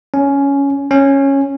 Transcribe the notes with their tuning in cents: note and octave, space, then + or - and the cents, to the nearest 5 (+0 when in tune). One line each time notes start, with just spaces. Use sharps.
C#4 +10
C#4 -10